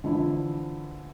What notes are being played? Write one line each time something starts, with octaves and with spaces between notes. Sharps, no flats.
D3 E3 F3 E4